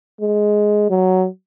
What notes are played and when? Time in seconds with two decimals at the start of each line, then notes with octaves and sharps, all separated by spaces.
0.21 G#3
0.90 F#3